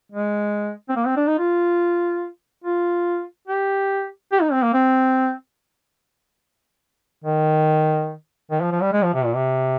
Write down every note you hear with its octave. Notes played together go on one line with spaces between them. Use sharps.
G#3
C4
A#3
C4
D4
D#4
F4
F4
G4
G4
D#4
C4
A#3
C4
D#3
D#3
F3
F3
G3
G#3
F3
C3
A#2
C3